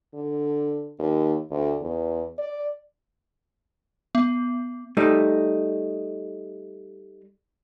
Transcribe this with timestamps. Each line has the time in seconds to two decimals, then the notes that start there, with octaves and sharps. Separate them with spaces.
0.14 D3
0.99 D#2
1.50 D2
1.81 E2
2.38 D5
4.15 B3
4.97 G3 A3 D#4